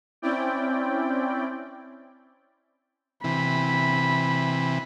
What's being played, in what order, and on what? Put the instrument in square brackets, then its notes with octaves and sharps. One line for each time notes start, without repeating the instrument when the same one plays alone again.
[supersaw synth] C4 C#4 E4 D5 G5
[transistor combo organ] C3 E3 [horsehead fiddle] B5